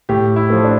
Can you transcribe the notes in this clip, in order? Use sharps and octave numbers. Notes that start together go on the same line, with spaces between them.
A2 G4
E4
F3 A3
D4